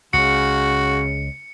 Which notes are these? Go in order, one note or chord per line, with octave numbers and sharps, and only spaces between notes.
C#2 C#3 F#4 C#7